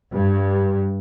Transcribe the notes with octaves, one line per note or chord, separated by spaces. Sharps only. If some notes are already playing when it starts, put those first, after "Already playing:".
G2